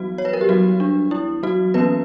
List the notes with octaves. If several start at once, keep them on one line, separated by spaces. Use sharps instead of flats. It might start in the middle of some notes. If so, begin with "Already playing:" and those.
Already playing: E3 F#3 G3 B3 F#4
C#5
B4
A#4
G4
F#3 F#4
D4
E4
F#3 F#4
E3 A#3 B3 C#4 B4